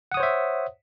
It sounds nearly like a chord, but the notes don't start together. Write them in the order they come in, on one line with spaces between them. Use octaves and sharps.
F#5 D#6 C#5 C5 E5